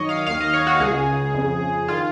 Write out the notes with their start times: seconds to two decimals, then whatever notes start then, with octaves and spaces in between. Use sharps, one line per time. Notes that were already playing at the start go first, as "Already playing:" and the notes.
Already playing: F#2 D#3 C#5 D#5
0.09 F5
0.27 D#2 D#3 F5
0.40 D#5
0.53 C#5
0.67 F#4
0.80 C#2 C#3 G#4
1.34 F2 C#3
1.88 D#3 F4